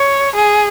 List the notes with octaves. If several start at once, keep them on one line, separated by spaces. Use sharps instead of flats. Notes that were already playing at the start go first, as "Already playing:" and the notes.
Already playing: C#5
G#4